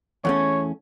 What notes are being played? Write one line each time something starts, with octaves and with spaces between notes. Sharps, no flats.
E2 A3 C#4 C#5